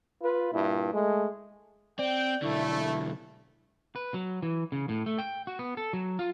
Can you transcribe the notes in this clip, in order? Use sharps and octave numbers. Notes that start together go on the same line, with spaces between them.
F4 B4
G2 A#2 E4
G#3 A3
C4 D5 G5
B1 D3 A3 E4
B4
F#3
E3
C#3
A2
A3
G5
F#4
B3
A4
F#3
F4